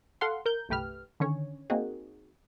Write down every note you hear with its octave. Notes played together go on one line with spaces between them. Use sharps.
A4 F5 F#5 C6
A#4 G6
G1 C2 A3 G4 B4 F6
D3 D#3 C#4 C#5
A#3 C4 D#4 F#4 G#4